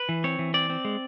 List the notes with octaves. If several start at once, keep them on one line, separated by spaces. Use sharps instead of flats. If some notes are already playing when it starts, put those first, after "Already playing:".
Already playing: B4
E3
C4 C#5
E3
C4 D5
C4
G#3